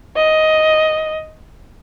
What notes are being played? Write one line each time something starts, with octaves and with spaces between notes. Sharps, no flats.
D#5